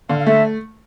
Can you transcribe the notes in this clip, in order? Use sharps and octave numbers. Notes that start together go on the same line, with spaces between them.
D3 F5
F5
A3 E5